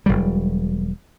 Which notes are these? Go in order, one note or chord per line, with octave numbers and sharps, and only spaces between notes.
E1 B1 F#3 G3